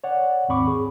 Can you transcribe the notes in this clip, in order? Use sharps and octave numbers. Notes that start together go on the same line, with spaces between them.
C#5 D5 F#5
D#2 G#2 C4 B5 C#6 D6
G#4